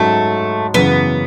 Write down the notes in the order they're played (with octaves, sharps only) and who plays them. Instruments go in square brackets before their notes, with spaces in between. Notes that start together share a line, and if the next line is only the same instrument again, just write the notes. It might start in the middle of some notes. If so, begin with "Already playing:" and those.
Already playing: [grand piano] G#2 F#3 C#4 [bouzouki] A3
[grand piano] F#2 C#3 E3 [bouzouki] B3